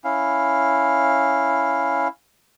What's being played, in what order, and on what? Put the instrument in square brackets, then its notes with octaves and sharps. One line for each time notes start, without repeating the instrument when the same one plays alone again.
[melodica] C#4 E4 F5